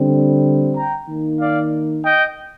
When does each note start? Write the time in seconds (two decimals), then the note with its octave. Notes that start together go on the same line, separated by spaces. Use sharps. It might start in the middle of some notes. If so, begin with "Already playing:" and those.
Already playing: D3 G3 C4
0.76 G5 A#5
1.08 D#3 A#3 D#4
1.40 D5 F5
2.04 D#5 G5